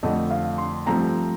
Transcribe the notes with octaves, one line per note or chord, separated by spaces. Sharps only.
F2 D3 A3 C4 D#5
F5
C6
G2 F3 A3 C4 A#5